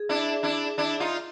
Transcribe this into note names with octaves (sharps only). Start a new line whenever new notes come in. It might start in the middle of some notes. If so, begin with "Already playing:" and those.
Already playing: G#4
D4 E4
D4 E4
D4 E4
D#4 F4